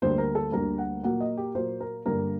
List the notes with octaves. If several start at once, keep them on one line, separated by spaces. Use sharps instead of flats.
D2 D3 G3 A#3 C5
A#4
A4
D2 D3 G3 A#3 A#4
F#5
A#2 F#3 A#3 F#5
D#5
G4
A#2 F#3 A#3 C5
A#4
G2 D3 G3 A#3 A#4